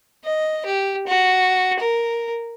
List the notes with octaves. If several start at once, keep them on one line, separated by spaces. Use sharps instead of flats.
D#5
G4
F#4
A#4